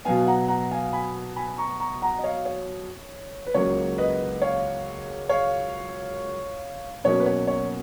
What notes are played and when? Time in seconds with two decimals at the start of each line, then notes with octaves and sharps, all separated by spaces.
0.05 B2 F#3 B3 F5 G#5
0.27 F#5 A#5
0.48 F#5 A#5
0.71 F5 G#5
0.93 G#5 B5
1.36 G#5 B5
1.58 A#5 C#6
1.80 A#5 C#6
2.02 F#5 A#5
2.19 D#5
2.24 C#5 F5
2.45 C#5
3.47 B4
3.54 C#2 C#3 F#3 A#3 C#5
3.98 B4 D#5
4.42 C#5 F5
5.29 C#5 F5
7.04 B2 F#3 A#3 C#4 C#5
7.20 B4
7.26 C#5
7.48 C#5